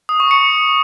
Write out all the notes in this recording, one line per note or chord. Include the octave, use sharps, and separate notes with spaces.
D#6
C#6
C#7